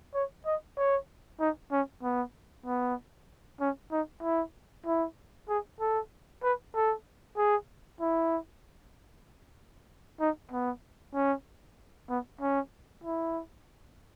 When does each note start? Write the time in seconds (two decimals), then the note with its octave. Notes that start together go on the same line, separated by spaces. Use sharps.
0.14 C#5
0.46 D#5
0.77 C#5
1.40 D#4
1.71 C#4
2.03 B3
2.66 B3
3.60 C#4
3.92 D#4
4.23 E4
4.86 E4
5.48 G#4
5.80 A4
6.43 B4
6.75 A4
7.37 G#4
8.00 E4
10.20 D#4
10.51 B3
11.14 C#4
12.09 B3
12.41 C#4
13.03 E4